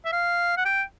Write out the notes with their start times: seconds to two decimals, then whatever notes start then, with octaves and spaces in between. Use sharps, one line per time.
0.05 E5
0.13 F5
0.57 F#5
0.65 G5